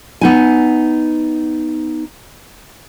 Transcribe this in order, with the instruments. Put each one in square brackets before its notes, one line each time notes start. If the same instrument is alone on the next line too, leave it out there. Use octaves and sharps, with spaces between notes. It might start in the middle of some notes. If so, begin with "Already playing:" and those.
[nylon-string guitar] B3 D#4 G#5